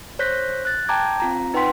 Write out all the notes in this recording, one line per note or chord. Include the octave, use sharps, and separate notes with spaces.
C5 C#5 F#6 G6 A#6 B6
F#6 A6
G5 A5 A#5 D6 G6 G#6
C4 F4 A#5
D#4 B4 F#5 G5 C6 B6